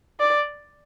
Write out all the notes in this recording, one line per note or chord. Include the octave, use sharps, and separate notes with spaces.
D5